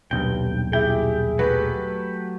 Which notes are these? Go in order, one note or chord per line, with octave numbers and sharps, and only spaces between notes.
D#1 B1 G2 G5
E4 G4 G#4 G5
F#3 A3 G4 B4